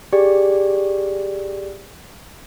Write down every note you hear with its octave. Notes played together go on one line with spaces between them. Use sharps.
G4 G#4 D5